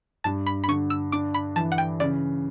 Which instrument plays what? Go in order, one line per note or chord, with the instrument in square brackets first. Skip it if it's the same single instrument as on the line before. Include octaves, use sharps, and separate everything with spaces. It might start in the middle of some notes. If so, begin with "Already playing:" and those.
[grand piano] G2 [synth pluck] A5
[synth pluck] B5
B5
[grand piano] D3 [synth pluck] C#6
[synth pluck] E6
[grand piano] D4 [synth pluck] D6
[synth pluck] B5
[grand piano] E3 [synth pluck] A5
[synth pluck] F#5
G5
[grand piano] C#3 [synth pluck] D5